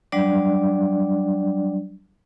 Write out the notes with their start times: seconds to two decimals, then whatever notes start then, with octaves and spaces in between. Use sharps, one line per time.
0.12 F#3 G3 D4 D5